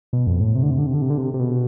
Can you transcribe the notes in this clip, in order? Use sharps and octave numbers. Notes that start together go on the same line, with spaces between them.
B2
F2
A2
C3
D3
C3
D3
C3
D3
C3
D3
C3
C3
B2